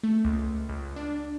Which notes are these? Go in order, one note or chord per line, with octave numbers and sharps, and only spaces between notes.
A3
C#2
C#2
D4